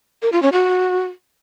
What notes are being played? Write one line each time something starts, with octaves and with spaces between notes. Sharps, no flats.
A#4
F4
C#4
F#4